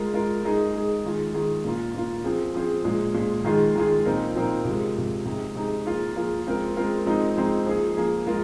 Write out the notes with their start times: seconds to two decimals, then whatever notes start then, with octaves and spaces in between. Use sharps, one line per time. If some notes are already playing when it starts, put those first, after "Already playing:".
Already playing: G#3 F4 A#4
0.14 G#3 F4 A#4
0.43 G#3 D#4 G#4
0.73 G#3 D#4 G#4
1.04 D#3 G#3 F4 G#4
1.34 D#3 G#3 F4 G#4
1.64 A#2 A#3 F4
1.94 A#2 A#3 F4
2.24 F3 C4 G#4
2.54 F3 C4 G#4
2.84 A#2 F3 G#3
3.14 A#2 F3 G#3
3.45 D#3 G#3 F4 G#4
3.75 D#3 G#3 F4 G#4
4.05 A#2 F3 C4 D#4 A#4
4.35 A#2 F3 C4 D#4 A#4
4.65 C3 F3 G#3
4.96 C3 F3 G#3
5.25 C3 G#3 D#4 G#4
5.55 C3 G#3 D#4 G#4
5.86 F3 A#3 F4 G#4
6.16 F3 A#3 F4 G#4
6.47 G#3 C4 F4 A#4
6.77 G#3 C4 F4 A#4
7.06 F3 G#3 C4 D#4
7.36 F3 G#3 C4 D#4
7.66 F3 A#3 G#4
7.97 F3 A#3 G#4
8.27 G#3 F4 A#4